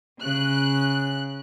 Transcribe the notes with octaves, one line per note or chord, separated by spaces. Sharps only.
C#3 F#6